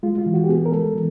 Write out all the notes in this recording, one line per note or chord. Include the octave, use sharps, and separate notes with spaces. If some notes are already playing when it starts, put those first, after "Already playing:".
G#3 F4
F4
E3
F#4
G4
B3 G#4
A#4
G#3 A4
E3